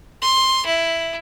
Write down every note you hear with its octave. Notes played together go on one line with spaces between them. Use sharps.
C6
E4